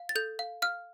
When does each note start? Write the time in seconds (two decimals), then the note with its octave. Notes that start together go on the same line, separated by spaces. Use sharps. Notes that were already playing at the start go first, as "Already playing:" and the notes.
Already playing: F5
0.09 A6
0.15 A4 G6
0.39 F5
0.62 F5 F6